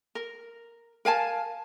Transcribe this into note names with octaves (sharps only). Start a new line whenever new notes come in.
A#4
A#4 F5 G#5 A5